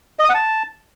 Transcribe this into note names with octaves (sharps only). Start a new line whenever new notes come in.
D#5
D#6
F#5
A5